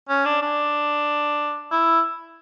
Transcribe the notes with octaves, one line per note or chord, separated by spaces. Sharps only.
C#4
D4
D4
E4